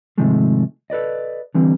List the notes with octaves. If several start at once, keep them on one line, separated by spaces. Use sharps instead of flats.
G#2 C3 D#3 F3 G#3 A3
A4 B4 D5 D#5
D3 E3 G3 C4